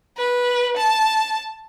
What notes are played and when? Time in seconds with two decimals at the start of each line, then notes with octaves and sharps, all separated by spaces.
0.18 B4
0.77 A5